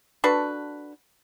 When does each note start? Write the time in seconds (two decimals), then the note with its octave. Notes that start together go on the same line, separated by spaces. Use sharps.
0.24 D4 F#4 A4 B4